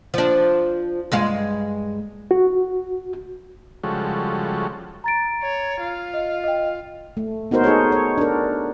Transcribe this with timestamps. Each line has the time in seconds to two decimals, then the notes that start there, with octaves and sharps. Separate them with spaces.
0.14 F3 D4
1.12 G2 G#3 F5
2.31 F#4
3.84 C#3 F3 G3 G#3 F#4 A4
5.04 A#5 A6 D7
5.42 C#5
5.81 F4
6.14 D#5
6.44 D#5 G5
7.17 A3
7.51 B3 D#4 F#4 A#4 C5
7.64 D#4 G#4 A4 C#5
7.92 C#5
8.18 D4 A#4